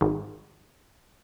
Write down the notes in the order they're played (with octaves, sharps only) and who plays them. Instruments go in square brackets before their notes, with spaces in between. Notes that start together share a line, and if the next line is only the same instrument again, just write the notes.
[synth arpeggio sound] G#1